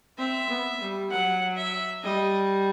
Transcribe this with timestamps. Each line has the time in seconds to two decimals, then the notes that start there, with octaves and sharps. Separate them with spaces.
0.18 C4 E5
0.49 B3
0.80 G3
1.11 F#3 F#5
1.57 E5
2.03 G3 D#5